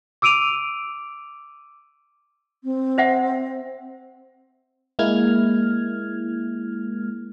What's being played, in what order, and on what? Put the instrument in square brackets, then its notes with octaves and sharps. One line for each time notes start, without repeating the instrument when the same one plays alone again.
[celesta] D6 E6 D7 D#7 F7
[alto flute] C4
[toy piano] C5 E5 F#5
[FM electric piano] G#3 A#3 E4 F6 G#6